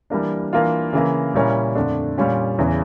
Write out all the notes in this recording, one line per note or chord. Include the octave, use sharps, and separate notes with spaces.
E3 G3 A#3 D4
E3 A#3 D4 F4
C#3 E3 A#3
A#2 G3 C#4 E4 A#4
F2 D3 A3 D4
A#2 G3 C#4 F4
E2 C#3 E3